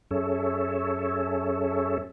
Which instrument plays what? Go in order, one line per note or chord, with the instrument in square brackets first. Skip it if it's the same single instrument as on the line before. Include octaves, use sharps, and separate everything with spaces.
[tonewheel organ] F#2 C#4 G#4 A4 C#5 E5